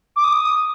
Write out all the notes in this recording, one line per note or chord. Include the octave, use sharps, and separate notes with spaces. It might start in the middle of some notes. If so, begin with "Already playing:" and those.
D6
D#6